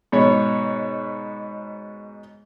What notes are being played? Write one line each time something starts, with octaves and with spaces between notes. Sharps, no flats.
G#2 B2 C#5